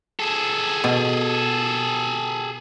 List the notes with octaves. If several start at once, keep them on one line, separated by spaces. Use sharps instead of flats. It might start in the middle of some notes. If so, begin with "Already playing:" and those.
G#4 A4
B2